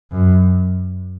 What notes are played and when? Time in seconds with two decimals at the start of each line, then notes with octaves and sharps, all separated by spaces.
0.12 F#2